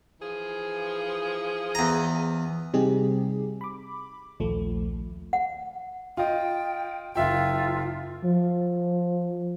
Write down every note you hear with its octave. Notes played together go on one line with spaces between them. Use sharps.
E3 F3 G#4
E2 A#5
C3 G3 C4 D#4 G4 G#4
B5 D6
A#1 D#2 F3 A3
F#5
F4 D#5 G5
F#1 F4 E5 G5
F3